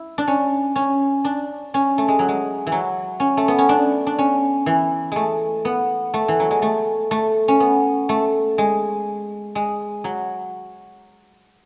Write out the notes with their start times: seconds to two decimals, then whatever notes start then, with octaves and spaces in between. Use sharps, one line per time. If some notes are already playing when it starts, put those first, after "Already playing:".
Already playing: E4
0.18 D4
0.28 C#4
0.76 C#4
1.25 D4
1.74 C#4
1.98 A3
2.08 G#3
2.19 F#3
2.28 G#3
2.67 E3
2.72 F#3
3.20 C#4
3.37 A3
3.48 B3
3.58 C#4
3.69 D4
4.07 D4
4.19 C#4
4.66 E3
5.12 G#3 A3
5.65 B3
6.14 A3
6.28 E3
6.40 F#3
6.51 G#3
6.62 A3
7.11 A3
7.48 C#4
7.60 B3
8.09 A3
8.58 G#3
9.55 G#3
10.04 F#3